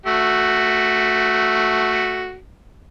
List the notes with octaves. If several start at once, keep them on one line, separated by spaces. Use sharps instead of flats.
A3 F#4